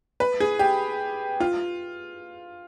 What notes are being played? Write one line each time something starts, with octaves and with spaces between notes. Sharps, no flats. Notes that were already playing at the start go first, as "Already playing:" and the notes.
B4
G#4
G4
F4